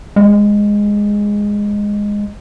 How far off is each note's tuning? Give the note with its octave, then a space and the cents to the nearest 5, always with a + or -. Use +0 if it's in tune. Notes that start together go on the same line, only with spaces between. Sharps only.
G#3 -10